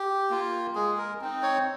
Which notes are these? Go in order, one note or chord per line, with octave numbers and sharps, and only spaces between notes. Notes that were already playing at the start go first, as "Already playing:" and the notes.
Already playing: G4
A#3 F4
G#3 G#4
A#4
C4 D#4
C#5